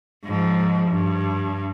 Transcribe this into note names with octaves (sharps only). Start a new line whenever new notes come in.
G#2 F3
G2